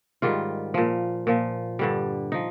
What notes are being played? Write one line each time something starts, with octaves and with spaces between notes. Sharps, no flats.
G#2 D#3 G3 F4
A#2 F3
A#2 F3
G2 D3 G3
F3 D#4